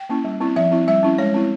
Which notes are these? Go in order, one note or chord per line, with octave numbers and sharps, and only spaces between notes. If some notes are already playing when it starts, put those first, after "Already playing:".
Already playing: G5
A#3 C#4 E4
G3
C4 E4
F3 E5
C4 E4
G3 E5
C#4 E4
G#3 C#5
C4 E4